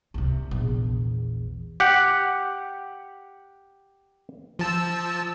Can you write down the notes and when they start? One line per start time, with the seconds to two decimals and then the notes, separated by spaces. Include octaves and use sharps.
0.14 C2 C3
0.51 A#1 E2
1.80 G4 F#5
4.59 F3 A5 E6